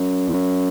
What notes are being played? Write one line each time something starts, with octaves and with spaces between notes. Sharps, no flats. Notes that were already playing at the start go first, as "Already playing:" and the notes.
Already playing: F#2
E2
F#2